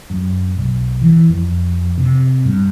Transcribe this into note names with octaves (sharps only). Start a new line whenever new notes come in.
F#2
B1
E3
F2
C3
G2